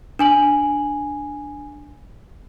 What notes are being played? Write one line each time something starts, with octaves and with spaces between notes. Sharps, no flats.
D4 G#5 F#7